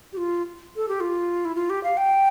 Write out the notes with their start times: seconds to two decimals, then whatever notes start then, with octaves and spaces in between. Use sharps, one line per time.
0.13 G4
0.17 F4
0.76 A4
0.89 G4
1.00 F4
1.45 E4
1.55 F4
1.70 G4
1.83 F5
1.97 G5